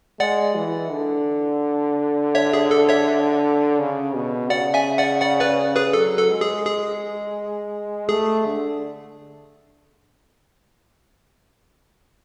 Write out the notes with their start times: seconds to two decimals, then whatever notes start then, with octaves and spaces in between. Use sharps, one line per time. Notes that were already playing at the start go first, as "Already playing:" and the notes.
0.20 G#3 D5 F#5
0.56 E3
0.91 D3
2.35 C#5 E5
2.53 G#4
2.71 A4
2.89 C#5 E5
3.79 C#3
4.15 B2
4.50 C#3 D5 F#5
4.74 E5 G#5
4.98 D5 F#5
5.22 D5 F#5
5.40 B4 D5
5.76 G#4 B4
5.93 F#3 A4
6.18 A4
6.30 G#3
6.41 G#4
6.66 G#4
8.09 A3 G#4
8.46 D3